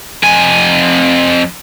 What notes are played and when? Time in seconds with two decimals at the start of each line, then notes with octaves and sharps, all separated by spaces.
0.23 F2 G#5